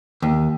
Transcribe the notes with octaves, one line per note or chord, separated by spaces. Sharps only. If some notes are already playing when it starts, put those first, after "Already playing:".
D#2